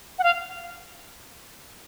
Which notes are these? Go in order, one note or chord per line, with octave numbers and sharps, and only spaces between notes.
F#5
F5